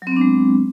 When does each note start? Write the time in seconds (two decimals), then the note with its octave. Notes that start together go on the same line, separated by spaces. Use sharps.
0.02 F#3
0.07 C4
0.12 B3
0.16 D4
0.21 G#3